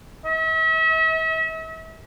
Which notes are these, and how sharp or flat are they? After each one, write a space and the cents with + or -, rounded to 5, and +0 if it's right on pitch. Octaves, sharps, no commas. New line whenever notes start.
E5 -40